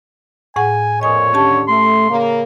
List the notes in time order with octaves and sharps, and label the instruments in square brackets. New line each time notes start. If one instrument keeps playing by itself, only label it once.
[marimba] A2 G#4 F#5 [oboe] G#5
[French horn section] F2 A#2 [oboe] C#5 [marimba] D#5 G#5 D#6
[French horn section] D#2 D3 [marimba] C#4 G4 A5
[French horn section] A3 [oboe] C6
[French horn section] C#3 A#3